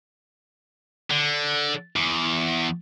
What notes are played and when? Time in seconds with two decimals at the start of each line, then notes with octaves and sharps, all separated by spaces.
1.10 D3
1.96 E2